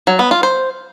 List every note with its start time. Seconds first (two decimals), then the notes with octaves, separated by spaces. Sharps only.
0.07 F#3
0.19 B3
0.31 F4
0.43 C5